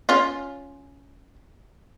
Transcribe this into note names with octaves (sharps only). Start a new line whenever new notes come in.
C#4 F4